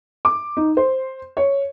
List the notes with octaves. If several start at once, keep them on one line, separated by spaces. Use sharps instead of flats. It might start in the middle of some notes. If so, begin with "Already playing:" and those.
D6
D#4
C5
C#5